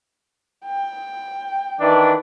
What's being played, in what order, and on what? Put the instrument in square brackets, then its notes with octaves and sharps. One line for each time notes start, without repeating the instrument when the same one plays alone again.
[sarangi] G5
[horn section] D#3 E3 D4